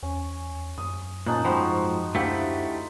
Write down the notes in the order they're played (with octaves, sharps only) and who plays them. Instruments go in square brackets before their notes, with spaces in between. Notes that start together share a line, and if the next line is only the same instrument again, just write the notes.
[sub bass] E2 [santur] C#4
[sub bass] F#2 [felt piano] D#6
[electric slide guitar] A#2 [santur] C#4 D#4 A5 [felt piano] F#6
[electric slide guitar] G#2 F3 [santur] C4 F#4 C5 [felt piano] B5
[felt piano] D2 F5 F#5 [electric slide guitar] A3 E4 G4